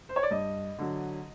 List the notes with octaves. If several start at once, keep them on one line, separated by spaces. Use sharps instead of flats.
C5
C#5
D5
G2 D#5
D3 F#3